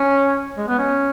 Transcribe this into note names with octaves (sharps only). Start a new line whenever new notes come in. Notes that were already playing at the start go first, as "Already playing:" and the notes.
Already playing: C#4
G#3
B3
C#4